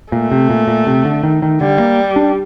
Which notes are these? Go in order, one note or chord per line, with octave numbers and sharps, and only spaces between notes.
A#2 A3
C3
A#2
A#2
C3
D3
D#3
D#3
D3 G3
A#3
D4